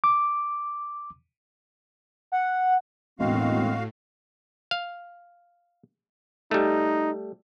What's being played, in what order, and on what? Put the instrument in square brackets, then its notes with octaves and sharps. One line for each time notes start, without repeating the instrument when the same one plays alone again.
[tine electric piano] D6
[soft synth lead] F#5
[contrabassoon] E1 [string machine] A2 [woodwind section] D#3 G#3 C4 [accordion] F#4 F5
[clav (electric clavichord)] F5
[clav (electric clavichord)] G3 A3 [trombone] D#4